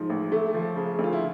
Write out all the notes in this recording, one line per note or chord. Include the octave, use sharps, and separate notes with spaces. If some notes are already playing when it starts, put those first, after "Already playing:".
Already playing: G#2 F3
A1
A3
F3
C#3
D2
F4
E4